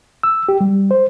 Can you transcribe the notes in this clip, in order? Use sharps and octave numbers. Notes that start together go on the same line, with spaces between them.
E6
G4
G3
C5